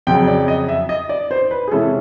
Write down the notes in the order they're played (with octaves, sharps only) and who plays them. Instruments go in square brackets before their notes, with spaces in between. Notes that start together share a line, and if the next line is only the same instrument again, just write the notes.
[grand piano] F2 C#3 F#3 G5
D5
D#5
E5
D#5
D5
C5
B4
G#4
C3 E3 G#3 C#4 E4 A4